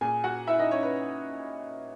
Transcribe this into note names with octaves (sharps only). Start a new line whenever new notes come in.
A#2 G#4 G#5
F#4 F#5
E4 E5
D#4 D#5
C#4 C#5
B4